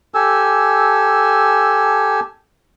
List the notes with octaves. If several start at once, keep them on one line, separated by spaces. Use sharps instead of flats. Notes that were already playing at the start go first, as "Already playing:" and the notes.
G4 A4 G#5 E6